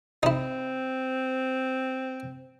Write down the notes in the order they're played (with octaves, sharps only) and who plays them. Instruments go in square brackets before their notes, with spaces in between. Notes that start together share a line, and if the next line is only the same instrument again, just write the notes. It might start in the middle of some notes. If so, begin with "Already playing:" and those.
[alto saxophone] C4 [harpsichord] D#4 E4